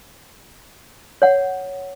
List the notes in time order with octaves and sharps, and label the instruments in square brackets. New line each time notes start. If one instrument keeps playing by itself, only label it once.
[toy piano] C#5 F#5